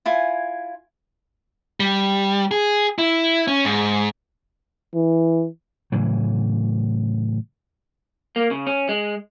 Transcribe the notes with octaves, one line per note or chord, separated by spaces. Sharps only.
E4 F4 G#5
G3
G#4
E4
C#4
G#2
E3
A2 C#3 E3 F#3
A#3
C#3
C#4
G#3